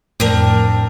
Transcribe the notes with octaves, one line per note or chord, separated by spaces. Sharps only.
F2 A2 C4 D4 A#4